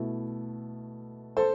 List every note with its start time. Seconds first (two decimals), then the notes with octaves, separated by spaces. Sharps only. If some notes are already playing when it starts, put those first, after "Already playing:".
Already playing: B2 A3 E4
1.37 A4 C5